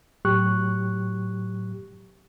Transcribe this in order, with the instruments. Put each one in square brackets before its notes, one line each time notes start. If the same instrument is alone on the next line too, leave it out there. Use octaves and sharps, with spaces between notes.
[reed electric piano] A2 F#3 G4 C#6 F#6